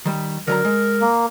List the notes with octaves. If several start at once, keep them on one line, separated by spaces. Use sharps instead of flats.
D#3 G3
D3 F#3 A#4 A#5
G#3
A#3